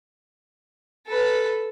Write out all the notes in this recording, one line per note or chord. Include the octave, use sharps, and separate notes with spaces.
A4 B4